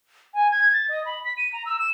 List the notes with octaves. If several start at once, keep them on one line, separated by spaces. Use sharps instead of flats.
G#5
G#6
A6
D#5
B5
B6
D#7
A#5
E6
E7